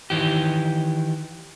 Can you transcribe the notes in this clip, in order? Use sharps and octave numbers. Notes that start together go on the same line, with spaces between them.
D#3 E3 G4